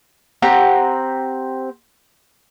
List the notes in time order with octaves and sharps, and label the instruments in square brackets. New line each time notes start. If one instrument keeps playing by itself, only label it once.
[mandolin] C4 G4 F#5 A#5